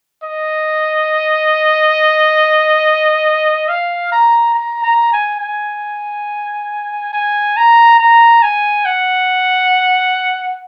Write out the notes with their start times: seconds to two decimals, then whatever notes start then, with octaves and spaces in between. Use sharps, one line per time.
0.23 D#5
3.69 F5
4.12 A#5
4.55 A#5
4.83 A#5
5.12 G#5
5.41 G#5
7.13 G#5
7.57 A#5
8.00 A#5
8.43 G#5
8.85 F#5